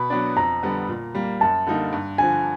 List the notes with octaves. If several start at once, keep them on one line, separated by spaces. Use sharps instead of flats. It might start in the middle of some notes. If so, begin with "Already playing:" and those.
Already playing: B2 B5
F#3 B3 D4
F2 A#5
D3 G3 B3
A#2
G3 A#3
F#2 A5
D3 G3 A#3 D#4
G2
D3 F3 G#5